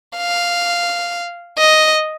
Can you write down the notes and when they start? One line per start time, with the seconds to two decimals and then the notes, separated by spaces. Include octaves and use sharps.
0.17 F5
1.58 D#5